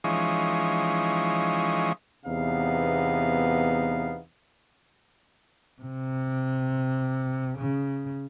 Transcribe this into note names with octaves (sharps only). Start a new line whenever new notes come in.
E3 F3 G#3 C#4 D#4
E2 C3 B3 D#4 F5
C3
C#3